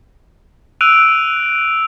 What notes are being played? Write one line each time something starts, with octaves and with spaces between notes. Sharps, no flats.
E6 F#6 D7 D#7 F7